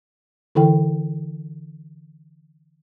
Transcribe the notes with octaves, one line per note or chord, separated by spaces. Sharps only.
D3 E3 E4 A4 G5